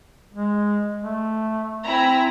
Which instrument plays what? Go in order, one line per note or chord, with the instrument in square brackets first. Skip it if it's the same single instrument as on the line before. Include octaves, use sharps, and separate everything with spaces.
[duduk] G#3
A3
[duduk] C4 [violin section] E4 G#5 A#5